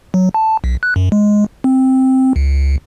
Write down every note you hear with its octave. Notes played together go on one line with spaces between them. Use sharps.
F#3
A5
B1
F#6
F#2
G#3
C4
C#2